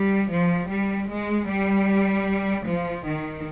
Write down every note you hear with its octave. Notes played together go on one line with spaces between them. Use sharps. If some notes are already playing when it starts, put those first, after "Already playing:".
Already playing: G3
F3
G3
G#3
G3
F3
D#3